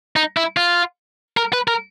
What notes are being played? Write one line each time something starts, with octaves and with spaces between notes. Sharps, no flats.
D#4
E4
F4
A#4
B4
A#4